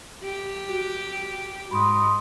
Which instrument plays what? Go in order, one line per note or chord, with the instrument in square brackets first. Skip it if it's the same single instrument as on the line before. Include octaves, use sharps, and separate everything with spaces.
[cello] G4
[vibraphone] F#4
[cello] G#2 [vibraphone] B5 C6 D#6